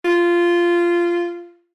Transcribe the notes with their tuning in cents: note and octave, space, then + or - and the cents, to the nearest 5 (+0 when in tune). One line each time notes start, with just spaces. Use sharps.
F4 -15